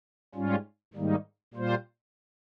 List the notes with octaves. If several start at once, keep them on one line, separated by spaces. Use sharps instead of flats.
G#2 G3 C#4 F4
G#2 D#3 G3 A#3 D#4
A#2 G3 A#3 F4 C5